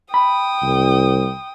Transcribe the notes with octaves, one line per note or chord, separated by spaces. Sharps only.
G5 B5 D#6
C2